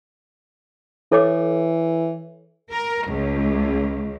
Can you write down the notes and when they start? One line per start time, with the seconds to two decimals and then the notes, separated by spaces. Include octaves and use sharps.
1.12 E3 A4 C#5 D6
2.72 A#4
3.08 C#2